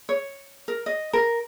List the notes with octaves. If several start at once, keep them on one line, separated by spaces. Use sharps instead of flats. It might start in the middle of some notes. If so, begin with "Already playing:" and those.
C#5
A#4
D#5
A#4